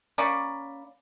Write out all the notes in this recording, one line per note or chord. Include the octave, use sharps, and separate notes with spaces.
A#3 C#4 D5 B5